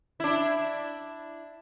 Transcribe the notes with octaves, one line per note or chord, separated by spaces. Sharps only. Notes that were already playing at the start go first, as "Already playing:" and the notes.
D4 E4